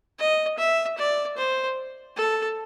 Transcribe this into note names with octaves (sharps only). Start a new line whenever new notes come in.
D#5
E5
D5
C5
A4